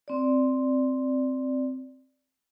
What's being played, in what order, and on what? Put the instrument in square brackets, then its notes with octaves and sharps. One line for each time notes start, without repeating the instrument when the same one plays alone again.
[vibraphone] C4 D5